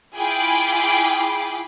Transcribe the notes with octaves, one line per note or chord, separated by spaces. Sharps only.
E4 F4 G#4 G5 B5 D6